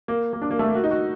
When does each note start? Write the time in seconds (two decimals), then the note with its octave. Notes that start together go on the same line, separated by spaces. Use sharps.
0.08 A#3
0.33 A#3
0.42 D4
0.51 A#3
0.59 A3
0.67 A#3
0.75 F#4
0.84 D#4
0.91 F#4